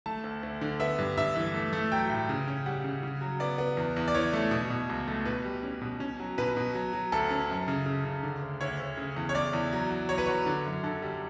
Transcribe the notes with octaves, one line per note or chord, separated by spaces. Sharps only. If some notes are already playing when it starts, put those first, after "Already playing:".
A3 A5
D2
D2
D3
B3 E5
G2
G2 E5
E3
A3
A3
F#3 G5
A2
C#3
C#4
G3 F#5
C#3
C#3
F#3
B3 D5
B3
E2
E2
D5
E3 C#5
A3
B2
B2
C#2
A3
B2 B4
G3
C#4
B2
C#4
F#3
B2 B4
B2
F#3
F#3
D2 A4
C#4
F#2
C#3
C#3
C#3
D3
D2
D2 C#5
D2
C#3
E2
C#5
E2 D5
E2
F#3
F#3
F#3 C#5
B4
F#3 C#5
D3
F#2
D3 A4
G3